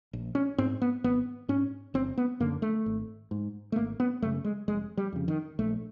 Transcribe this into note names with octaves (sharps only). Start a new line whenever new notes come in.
A#1
C#4
G#2 C4
B3
G#1 B3
G#2 C#4
G1 C4
B3
F#2 D3 A#3
A3
G#1
G#2
A3
G#1 A#3
B3
F#2 C#3 A3
G#3
F1 G#3
G3
F2 C#3
D#3
A#1 A3